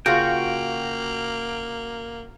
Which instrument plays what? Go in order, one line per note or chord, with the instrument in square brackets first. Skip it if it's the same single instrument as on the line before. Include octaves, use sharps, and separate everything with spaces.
[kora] C#3 F4 [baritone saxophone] A#3 [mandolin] F#4 [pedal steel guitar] G5